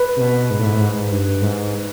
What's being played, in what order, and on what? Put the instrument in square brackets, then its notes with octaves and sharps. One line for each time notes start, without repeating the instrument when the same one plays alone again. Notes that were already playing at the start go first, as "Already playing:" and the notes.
Already playing: [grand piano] B4
[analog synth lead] C3
B2
G#2
A2
G#2
A2
G#2
G2
G#2